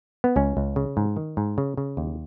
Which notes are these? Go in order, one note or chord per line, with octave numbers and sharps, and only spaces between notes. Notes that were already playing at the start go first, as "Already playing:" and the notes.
B3
C#2 C#4
C#2
C#3
G#2
D#3
G#2
C#3
C#3
D#2